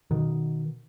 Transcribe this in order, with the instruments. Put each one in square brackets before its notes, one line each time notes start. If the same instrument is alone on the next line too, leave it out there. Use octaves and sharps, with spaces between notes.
[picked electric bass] B2 D#3